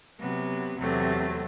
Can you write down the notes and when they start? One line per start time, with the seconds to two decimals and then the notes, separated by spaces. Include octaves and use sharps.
0.20 C3 F#3 B3
0.79 E2 C3 F#3 A3 C4